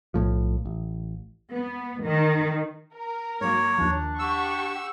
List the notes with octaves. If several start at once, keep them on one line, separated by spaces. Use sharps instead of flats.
B1 A2 F3
A1
B3
D#3
A#4
G#2 F#3 A#3 C#5
D#2 F3 D4
G4 F#5 C#6 E6